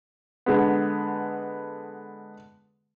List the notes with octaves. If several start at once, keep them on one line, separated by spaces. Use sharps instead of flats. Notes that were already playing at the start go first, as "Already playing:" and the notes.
D3 G#3 B3